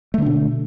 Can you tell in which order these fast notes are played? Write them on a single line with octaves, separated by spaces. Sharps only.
A3 D3 D4 B2